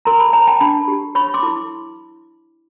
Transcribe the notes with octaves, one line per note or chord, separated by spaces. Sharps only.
A#4 A#5 C6
A5 B5
C#5 G#5 A#5
G5 A5
D4 A5 B5
G4
C#5 B5 C#6
C6 D6
E4